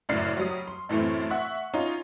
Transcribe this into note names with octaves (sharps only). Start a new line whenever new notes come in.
F#1 F#2 A2 D5 F6 C7
F#3 G3 D#6
C6
F#2 A2 E3 A3 C4
E5 F#5 C#6
C#4 D#4 F4